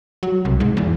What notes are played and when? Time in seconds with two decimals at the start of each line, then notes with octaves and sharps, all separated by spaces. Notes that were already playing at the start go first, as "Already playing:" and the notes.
0.23 F#3
0.45 C2
0.60 G#2
0.77 E2